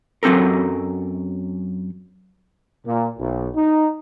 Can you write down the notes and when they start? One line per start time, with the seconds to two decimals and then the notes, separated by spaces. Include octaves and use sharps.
0.23 F#2 F#3 C4 A4 A#4
2.86 A#2
3.19 B1
3.55 D#4